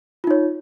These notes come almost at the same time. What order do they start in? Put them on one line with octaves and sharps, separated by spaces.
F4 D#4 C#5